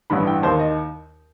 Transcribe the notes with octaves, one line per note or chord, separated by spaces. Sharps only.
A1 G2 E3 B5
G5
D#2 D#3 C5
D#5